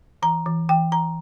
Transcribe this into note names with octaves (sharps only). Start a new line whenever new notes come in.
E3 A#5
E3
E3 G5
E3 A#5